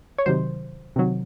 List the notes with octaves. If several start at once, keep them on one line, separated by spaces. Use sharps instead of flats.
C#5
C3 D#3 F#3 C5
C3 D#3 F#3